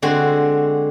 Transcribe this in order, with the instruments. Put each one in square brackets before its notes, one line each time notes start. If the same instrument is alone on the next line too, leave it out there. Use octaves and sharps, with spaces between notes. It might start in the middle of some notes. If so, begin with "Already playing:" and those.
[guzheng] D3 G#3 C4 F#4